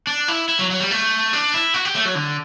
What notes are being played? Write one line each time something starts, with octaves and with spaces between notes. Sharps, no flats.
D4
E4
E4
F#3
F#3
G3
A3
D4
E4
F#4
G4
A3
F#3
D3